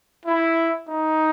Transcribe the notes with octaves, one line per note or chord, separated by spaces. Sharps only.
E4
D#4